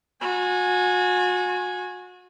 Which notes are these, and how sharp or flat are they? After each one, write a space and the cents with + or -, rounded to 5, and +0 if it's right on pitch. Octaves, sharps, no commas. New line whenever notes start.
F#4 -35 G#5 +0